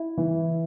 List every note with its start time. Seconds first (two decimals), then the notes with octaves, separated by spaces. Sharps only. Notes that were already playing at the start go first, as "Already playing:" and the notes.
Already playing: E4
0.17 E3